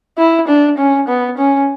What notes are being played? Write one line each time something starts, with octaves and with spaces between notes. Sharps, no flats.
E4
D4
C#4
B3
C#4